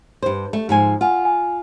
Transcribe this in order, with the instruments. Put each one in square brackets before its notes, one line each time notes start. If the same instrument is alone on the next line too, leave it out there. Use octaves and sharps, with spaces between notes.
[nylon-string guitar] G2 C5
A3
G#2 F3 G#5
[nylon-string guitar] F4 [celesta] F#5 G#5
[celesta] G#5